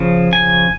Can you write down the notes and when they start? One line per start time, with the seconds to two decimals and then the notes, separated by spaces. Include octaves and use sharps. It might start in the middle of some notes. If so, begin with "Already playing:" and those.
Already playing: C#3 F3
0.33 G#5